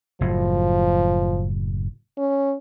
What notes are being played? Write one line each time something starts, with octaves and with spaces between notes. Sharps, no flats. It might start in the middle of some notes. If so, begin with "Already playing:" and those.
F#1 A2 F3
C#4